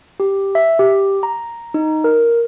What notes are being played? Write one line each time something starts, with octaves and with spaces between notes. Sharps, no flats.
G4
E5
G4
A#5
D#4
A#4